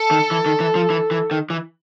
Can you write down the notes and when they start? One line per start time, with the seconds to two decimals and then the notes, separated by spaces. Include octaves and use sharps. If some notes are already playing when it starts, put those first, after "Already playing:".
Already playing: A4
0.11 D#3
0.31 E3
0.46 D#3
0.60 E3
0.75 F3
0.90 E3
1.11 E3
1.31 D#3
1.50 E3